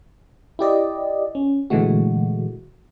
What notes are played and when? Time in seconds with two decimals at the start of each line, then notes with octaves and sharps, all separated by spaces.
0.59 E4 G4 D5 D#5
1.35 C#4
1.70 A#2 D3 E3 G#3 A3 F#4